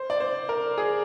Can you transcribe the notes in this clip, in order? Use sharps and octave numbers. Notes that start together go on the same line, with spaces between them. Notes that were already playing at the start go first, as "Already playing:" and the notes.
Already playing: C5
D5
C5
A#4
G#4